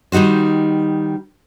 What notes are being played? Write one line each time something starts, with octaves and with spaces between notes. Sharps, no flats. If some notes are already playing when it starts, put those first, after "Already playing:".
D#3 G3 D#4 F#4 C5